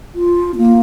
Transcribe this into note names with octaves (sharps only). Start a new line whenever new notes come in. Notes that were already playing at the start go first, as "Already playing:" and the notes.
F4
C4
A#3